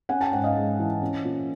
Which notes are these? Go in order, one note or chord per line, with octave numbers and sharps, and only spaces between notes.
C#4 F#5 G#5
G5 A5
G#2 F#5 G#5
D#5 F5
G#3
E3
C#4
A#2